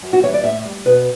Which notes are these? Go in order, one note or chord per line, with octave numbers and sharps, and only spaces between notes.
F#2
F#4
E3 G3 C#5
D5
A2 E5
G3
B2 B4